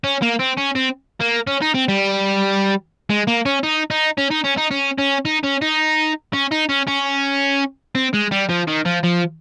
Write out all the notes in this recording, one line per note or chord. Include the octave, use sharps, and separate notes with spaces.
C#4
A#3
C4
C#4
C4
A#3
C#4
D#4
C4
G3
G#3
A#3
C#4
D#4
D#4
C#4
D#4
C#4
D#4
C#4
C#4
D#4
C#4
D#4
C#4
D#4
C#4
C#4
C4
G#3
G3
F3
D#3
F3
F3